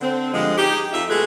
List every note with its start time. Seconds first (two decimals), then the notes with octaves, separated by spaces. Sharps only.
0.01 D3 C4
0.34 G2 D3 F3 G#3
0.58 D#4 G4 G#4
0.93 F2 F3 D#4 E5
1.09 B2 G#3 A3 G#4 A4 B4